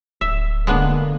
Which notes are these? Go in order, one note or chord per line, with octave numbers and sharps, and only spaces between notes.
D1 E5
D3 G#3 A#3 B3 D4